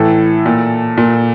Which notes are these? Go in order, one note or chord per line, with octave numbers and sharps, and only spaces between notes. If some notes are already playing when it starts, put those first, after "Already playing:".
Already playing: A2 E3 A4
A#2
A#2